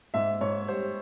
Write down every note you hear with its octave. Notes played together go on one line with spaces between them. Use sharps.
G#2 E5
G#2 C#5
G3 C5